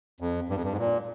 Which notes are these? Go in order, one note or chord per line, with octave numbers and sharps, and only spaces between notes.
F2
G2
F2
G2
G#2
A#2